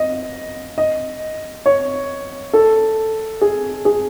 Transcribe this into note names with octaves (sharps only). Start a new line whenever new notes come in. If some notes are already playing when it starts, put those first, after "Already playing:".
Already playing: D#5
D#5
C#5
A4
G#4
G#4